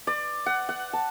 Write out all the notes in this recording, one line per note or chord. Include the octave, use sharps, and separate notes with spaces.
D5
F#5
F#5
A5